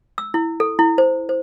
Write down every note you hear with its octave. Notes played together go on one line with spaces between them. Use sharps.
E6
E4
A4
E4
C5
C5